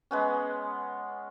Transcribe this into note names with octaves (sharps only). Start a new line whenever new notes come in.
G#3 B3 C#4